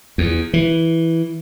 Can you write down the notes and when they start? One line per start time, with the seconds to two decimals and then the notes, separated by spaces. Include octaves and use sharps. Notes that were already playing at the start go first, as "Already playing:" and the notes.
0.18 E2
0.54 E3